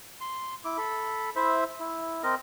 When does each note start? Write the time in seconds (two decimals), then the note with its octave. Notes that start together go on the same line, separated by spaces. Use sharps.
0.21 C6
0.65 E4 D6
0.78 A4 B5
1.36 E4 C5 E5 B5
1.80 E4
2.23 C4 A#4 D#5